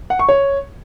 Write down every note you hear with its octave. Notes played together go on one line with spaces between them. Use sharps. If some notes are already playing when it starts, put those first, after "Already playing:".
F#5
C#6
C#5